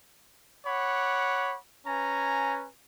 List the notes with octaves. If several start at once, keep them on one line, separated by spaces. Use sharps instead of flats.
C#5 F#5 B5 D6
C#4 B4 G#5 A#5